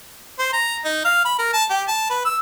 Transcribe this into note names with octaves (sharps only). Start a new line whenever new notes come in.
C5
A#5
D#4
F5
B5
A#4
A5
G4
A5
B4
E6